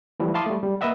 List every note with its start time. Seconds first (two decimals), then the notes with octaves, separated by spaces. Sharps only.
0.20 E3 F3 G3 A3
0.34 E4 F5 A5 C6 D6 D#6
0.46 G3 A3
0.63 G3
0.81 A#3 B4 D#5 E5 F#5